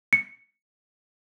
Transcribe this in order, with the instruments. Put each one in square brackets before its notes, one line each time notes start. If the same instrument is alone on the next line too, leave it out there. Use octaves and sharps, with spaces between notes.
[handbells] C#7